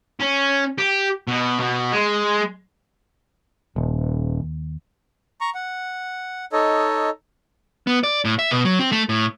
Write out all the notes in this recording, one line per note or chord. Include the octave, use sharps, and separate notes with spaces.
C#4
G4
B2
B2
G#3
D#1 D#2
A#5 C#6
F#5
D#4 A4 C#5 D#5
B3
D5
A2
E5
B2
F#3
C4
A3
A2